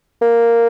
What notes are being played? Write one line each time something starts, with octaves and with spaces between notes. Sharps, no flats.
A#3